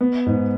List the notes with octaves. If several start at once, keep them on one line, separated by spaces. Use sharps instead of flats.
B3
G#2